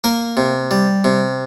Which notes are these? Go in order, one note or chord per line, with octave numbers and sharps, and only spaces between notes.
A#3 A#4
C3
G3
C3